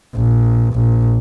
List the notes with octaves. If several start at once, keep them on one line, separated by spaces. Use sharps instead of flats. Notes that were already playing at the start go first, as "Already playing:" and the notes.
A#1
A#1